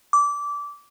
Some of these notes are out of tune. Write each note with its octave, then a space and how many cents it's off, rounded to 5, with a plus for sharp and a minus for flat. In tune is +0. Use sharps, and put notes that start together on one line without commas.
D6 -20